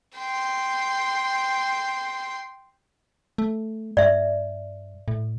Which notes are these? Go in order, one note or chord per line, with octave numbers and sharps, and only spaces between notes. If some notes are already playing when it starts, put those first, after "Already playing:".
G5 C6
A3
G2 D5 E5
A2